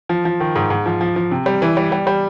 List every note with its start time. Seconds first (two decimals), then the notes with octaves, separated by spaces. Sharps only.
0.09 F3
0.25 F3
0.40 D#3
0.56 G#2
0.70 G#2
0.86 F3
1.01 F3
1.16 F3
1.31 C3
1.46 G3
1.62 E3
1.77 G3
1.92 G3
2.07 G3